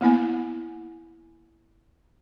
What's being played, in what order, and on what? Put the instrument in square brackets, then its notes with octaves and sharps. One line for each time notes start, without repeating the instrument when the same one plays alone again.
[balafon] A#3 B3 E4 G#5